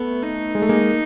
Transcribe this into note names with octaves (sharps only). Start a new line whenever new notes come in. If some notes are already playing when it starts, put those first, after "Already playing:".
Already playing: A3 B3
D#4
G#3
A3
G#3 A#3